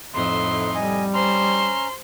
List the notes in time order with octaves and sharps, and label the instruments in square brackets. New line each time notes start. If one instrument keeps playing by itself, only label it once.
[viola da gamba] F2 A2 D#4 [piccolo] C6
[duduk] G3 [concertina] D#5 G#5
[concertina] C#4 A#5 [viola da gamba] C5 [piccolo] C6